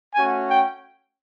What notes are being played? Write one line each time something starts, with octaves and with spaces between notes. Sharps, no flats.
A3 C#4 F#4 G#5
G5